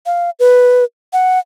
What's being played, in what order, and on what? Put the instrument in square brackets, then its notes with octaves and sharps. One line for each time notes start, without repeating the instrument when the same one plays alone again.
[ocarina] F5
B4
F#5